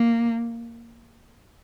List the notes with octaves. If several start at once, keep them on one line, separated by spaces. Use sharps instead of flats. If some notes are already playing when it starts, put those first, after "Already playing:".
Already playing: A#3